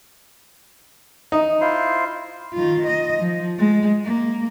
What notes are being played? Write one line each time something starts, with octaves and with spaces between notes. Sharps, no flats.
D#4
E4 F4 C5
D#3 F4
D#5
F3
G#3
A#3